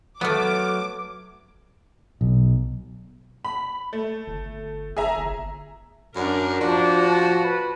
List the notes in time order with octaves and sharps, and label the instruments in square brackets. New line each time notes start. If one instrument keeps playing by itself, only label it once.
[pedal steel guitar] F#3 F6 [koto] A3 B3 [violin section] D6
[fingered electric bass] B1
[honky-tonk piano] B5
A3
[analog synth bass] G1
[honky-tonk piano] G#4 E5 A#5
[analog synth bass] G1
[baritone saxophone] F#2 [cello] D4 A#4
[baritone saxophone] F3 [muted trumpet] D4 [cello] F#4
[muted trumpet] A5
B4